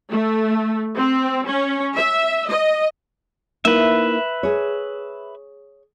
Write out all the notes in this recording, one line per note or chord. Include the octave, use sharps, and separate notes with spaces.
A3
C4
C#4
E5
D#5
A#3 D#4 E4 B4 E5
G#4 C#5